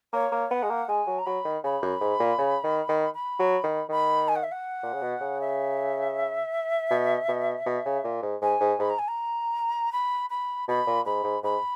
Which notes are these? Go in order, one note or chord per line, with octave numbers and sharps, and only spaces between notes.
A#3 C#5
A#3
B3 F#5
G#3
A#3
G#3 G#5
F#3
A#5
F#3 B5
D#3
C#3 B5
F#2
G#2
A#2
C#3
D#3
D#3
B5
F#3
D#3
D#3 B5
G#5
F#5
E5
F#5
A#2
C#3
B2
C#3
E5
B2
B2
B2
C#3
A#2
G#2
G#2 G#5
G#2
G#2 B5
A#5
G#5
A#5
B5
B5
B2 B5
A#2
G#2 B5
G#2
G#2 B5